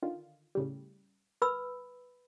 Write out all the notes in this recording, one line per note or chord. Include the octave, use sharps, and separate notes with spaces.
D3 D#3 F4
A2 C#3 G3
B4 B5 E6